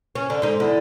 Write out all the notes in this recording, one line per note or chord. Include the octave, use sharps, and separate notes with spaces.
C#4
D3
G#2 D#4
E2 D3